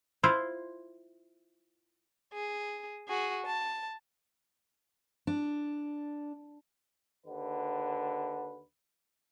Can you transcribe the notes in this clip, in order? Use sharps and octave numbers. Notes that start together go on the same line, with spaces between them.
E4 F4 C5
G#4
F#4 G#4
A5
D4
D#2 D3 B4